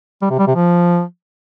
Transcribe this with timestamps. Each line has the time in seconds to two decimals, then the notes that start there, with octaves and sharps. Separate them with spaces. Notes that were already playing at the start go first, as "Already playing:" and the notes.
0.22 G3
0.30 C3
0.39 G3
0.47 C3
0.55 F3